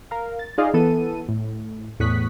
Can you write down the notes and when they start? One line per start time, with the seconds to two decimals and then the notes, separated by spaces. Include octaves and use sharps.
0.11 A#4 F5
0.39 A6
0.58 D#4 F4 G#4 D5 D#5 F5
0.74 E3 B3 A4 D#7
1.29 A2
2.00 E2 A2 C#6 D#6 F#6 B6